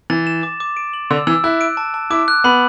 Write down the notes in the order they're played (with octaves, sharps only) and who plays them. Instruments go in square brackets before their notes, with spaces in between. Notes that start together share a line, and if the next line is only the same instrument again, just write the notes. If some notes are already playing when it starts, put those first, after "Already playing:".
[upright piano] E3 [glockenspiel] A6
[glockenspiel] E7
D6
D6
D7
F#7
[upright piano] D3 [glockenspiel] E6
[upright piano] E3 [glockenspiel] E6
[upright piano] E4 [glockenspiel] F#6
[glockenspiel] D7
A5
A5
[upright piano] E4 [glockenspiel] D6
[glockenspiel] F#6
[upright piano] B3 [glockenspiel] B5